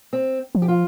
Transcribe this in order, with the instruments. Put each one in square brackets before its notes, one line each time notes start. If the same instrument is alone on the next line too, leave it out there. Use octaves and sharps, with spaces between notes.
[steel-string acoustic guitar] C4
[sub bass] F3
[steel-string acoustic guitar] G4
F4